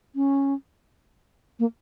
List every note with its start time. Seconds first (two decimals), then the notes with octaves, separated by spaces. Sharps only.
0.16 C#4
1.59 A#3